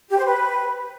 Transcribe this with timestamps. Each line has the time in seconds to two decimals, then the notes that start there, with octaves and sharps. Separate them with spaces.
0.10 G4
0.17 C5
0.25 B4